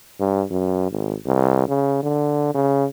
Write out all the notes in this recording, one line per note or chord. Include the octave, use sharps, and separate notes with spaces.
G2
F#2
G#1
C2
C#3
D3
C#3